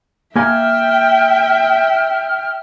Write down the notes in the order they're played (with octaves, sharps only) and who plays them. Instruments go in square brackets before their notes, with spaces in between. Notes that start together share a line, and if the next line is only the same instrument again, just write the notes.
[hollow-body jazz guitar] A#3 G#5 [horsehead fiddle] E5 G5 [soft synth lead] F6